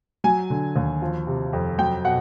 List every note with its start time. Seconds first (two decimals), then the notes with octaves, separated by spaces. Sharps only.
0.24 F#3 G#5
0.50 D3
0.76 D#2
1.02 F3
1.27 C3
1.53 F2
1.78 F#3 G5
2.05 B2 F#5